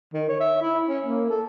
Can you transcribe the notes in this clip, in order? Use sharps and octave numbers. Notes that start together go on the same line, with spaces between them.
D#3
C#5
E5
E4
C#4
A#3
A4